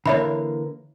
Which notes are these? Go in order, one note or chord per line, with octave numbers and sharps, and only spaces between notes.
D3 E3 A#3 C#5 E5 B5